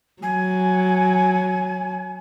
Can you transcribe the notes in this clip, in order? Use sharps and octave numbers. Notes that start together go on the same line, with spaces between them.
F#3 G#5